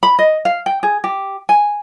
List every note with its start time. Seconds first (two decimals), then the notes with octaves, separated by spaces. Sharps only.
0.03 B5
0.19 D#5
0.45 F5
0.66 G5
0.83 G#4
1.04 G4
1.49 G#5